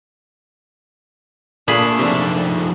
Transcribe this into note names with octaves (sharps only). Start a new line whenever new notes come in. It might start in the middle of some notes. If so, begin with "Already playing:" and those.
A#2 A3 A#3 D4 G#4 B5
C3 F3 D#4 G4